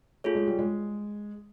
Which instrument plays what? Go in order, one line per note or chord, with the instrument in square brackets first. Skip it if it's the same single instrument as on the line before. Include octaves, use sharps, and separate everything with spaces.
[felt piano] A3 [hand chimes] F4 G#4 C#5
[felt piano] G#3
G3
G#3